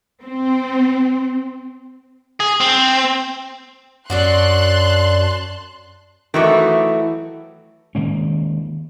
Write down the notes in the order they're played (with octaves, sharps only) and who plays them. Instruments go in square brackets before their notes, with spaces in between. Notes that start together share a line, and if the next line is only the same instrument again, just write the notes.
[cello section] C4
[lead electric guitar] G#4
C4
[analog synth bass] F#2 [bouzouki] F#3 D4 F#4 [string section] A5 C6 F#6
[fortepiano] D#3 F#4 D6 [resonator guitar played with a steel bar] E3 F#3 A3
[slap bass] D#3 G#3 A#3 C#4